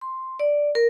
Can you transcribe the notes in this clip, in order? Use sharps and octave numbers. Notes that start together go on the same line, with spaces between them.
C6
D5
A#4